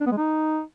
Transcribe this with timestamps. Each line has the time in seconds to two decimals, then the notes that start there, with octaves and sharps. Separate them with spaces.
0.01 D4
0.06 B3
0.12 G#3
0.17 D#4